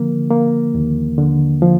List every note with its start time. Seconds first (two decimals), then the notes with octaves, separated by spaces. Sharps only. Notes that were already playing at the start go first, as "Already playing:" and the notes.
Already playing: D3 F3 A#3
0.31 A#3
0.74 D#2
1.18 D3
1.62 F3